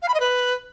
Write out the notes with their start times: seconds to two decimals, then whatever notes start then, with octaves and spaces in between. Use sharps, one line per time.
0.02 F5
0.08 B5
0.14 D#5
0.20 B4